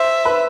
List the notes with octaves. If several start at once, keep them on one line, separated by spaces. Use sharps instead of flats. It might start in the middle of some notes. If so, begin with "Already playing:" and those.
Already playing: C5 E5
B4